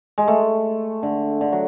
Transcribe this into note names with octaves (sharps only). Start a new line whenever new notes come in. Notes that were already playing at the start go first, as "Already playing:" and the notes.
G#3
A3
D3
D3
F#3